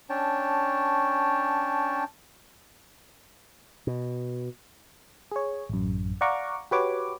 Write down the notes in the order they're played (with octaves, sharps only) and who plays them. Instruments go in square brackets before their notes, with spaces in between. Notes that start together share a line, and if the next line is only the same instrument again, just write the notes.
[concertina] C#4 D4 C#5 G5 A5
[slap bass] B2
[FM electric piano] G#4 C#5
A1 F#2
D5 F5 F#5 A#5 C#6 D6
F#4 G4 B4 C#5 D6